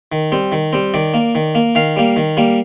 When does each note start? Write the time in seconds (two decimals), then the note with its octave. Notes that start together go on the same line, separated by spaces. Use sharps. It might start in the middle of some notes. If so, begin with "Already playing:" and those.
0.12 D#3
0.32 G3 C4
0.52 D#3
0.73 G3 C4
0.94 D#3 D5
1.14 A#3
1.35 D#3
1.55 A#3
1.75 D#3 F5
1.96 G3 A#3
2.17 D#3
2.37 G3 A#3